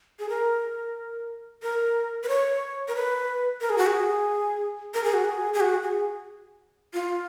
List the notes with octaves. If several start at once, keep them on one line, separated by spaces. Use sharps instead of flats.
G#4
A#4
A#4
B4
C#5
A#4
B4
A#4
G#4
F#4
G#4
A#4
G#4
F#4
G#4
G#4
F#4
G#4
F4